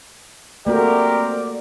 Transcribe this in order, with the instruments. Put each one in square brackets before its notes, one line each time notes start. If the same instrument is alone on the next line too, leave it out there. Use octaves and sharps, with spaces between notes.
[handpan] A3 A#3 F#4 [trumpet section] C4 G4 A#4 [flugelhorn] D5